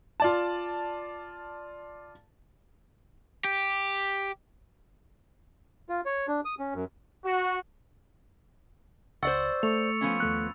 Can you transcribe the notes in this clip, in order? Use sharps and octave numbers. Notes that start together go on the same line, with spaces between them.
F4 D5 A5
G4
F4
C#5
D4
D#6
C#4
F#2
F#4
C#2 C5 D5 F#5 C#6 E6 A6
A3 C#6 F7
F3 B3 C#4
D#2 A3 F#6